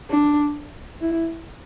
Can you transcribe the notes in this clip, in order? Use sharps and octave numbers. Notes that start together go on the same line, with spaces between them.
D4
E4